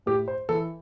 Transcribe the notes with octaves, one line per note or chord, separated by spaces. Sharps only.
A2 G4
C5
E3 A4